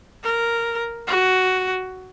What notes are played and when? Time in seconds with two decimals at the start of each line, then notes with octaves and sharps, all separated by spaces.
0.23 A#4
1.07 F#4